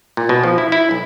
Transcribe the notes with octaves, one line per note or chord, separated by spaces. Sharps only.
A#2
B2
F3
E4
E4
B1